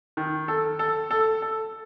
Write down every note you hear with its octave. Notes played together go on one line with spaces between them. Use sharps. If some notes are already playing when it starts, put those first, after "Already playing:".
D#3
A4
A4
A4
A4